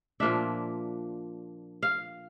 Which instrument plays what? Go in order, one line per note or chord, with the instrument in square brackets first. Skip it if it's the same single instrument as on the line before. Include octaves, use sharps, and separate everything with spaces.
[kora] A#2 F3 A#3 D4 E5
F5